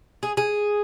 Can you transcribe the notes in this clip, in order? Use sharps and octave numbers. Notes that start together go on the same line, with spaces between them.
G#4
G#4